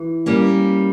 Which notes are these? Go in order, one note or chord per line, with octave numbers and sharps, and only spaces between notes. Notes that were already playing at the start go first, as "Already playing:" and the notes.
Already playing: E3
G3 A#3 C#4